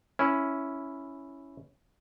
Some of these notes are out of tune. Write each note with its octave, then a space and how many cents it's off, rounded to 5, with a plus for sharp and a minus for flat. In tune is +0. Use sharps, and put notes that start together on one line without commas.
C#4 +5 E4 +0